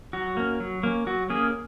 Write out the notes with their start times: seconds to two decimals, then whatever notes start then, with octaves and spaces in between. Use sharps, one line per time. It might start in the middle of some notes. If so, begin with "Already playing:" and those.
0.13 F#3 F#4
0.37 A#3 C#4
0.60 F#3
0.83 A#3 C#4
1.07 F#3 F#4
1.30 A#3 C#4 G#4